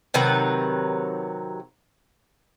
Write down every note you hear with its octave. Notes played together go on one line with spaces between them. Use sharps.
C3 D#3 F#3 B4